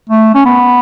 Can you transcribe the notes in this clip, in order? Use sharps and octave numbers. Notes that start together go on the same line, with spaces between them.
A3
C#4
B3